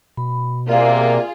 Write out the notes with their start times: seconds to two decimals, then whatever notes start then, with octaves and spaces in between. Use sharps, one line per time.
0.17 B2 B5
0.68 C3 A#3 F4 G#4 A#4 D5 F5